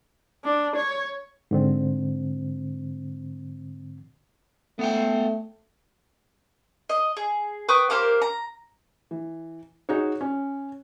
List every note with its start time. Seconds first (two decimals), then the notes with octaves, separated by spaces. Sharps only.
0.44 D4
0.76 C#5
1.51 G#2 D3 C4
4.79 A3 B3 F#5 G5
6.89 D#5
7.17 G#4
7.69 B4 G5 C#6 D#6
7.90 A#3 G4 A#4 C5
8.22 A#5
9.11 E3
9.89 D#4 F#4 G#4 C#5
10.21 C#4